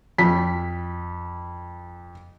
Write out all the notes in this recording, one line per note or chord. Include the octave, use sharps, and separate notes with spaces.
F2 B6